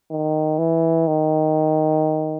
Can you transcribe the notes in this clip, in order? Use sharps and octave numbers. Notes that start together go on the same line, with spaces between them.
D#3
E3
D#3